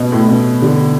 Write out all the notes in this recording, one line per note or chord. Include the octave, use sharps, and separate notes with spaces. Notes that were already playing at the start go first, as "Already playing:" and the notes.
Already playing: B2
A2
B2
D3